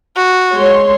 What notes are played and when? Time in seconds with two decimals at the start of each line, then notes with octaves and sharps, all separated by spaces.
0.16 F#4
0.54 G#3 C#5 C6